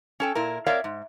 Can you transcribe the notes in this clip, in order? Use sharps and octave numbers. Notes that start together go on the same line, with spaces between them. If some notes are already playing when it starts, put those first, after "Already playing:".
C#4 A4 G5
A#2 E4 A#4
C4 A#4 C#5 D5 E5 F5
G#2